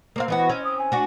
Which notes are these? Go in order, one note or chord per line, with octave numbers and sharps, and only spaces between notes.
A#3 C4 F5
E3 B3 F#4 D#5
C4 C#4
D#6
G#5
D4 F#4